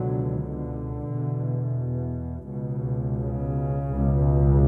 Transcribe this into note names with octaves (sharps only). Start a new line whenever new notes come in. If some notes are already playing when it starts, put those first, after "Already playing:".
Already playing: C#2 B2 D3 F#3
D3
E2 B2
C#2 B2
C#3
C#2 B2